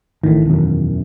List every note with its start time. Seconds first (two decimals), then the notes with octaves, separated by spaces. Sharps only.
0.24 A1 A2 D#3 E3
0.45 E1 F#2